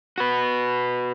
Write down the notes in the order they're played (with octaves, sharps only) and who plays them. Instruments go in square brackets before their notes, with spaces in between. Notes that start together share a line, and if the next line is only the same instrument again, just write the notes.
[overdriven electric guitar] F#4 B4